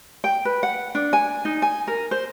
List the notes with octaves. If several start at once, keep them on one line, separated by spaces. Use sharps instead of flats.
G5
B4
F#5
D4
G#5
D#4
G#5
A#4
C5